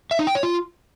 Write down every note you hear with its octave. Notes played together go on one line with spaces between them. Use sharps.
E5
D#4
G5
C#5
F4